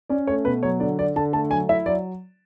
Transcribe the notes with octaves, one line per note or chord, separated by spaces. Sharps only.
C#4 D5
A3 C#5
B2 B4
F#3 C#5
D3 D5
D4 D5
D3 A5
A3 A5
F#3 G#5
E4 E5
F#3 D5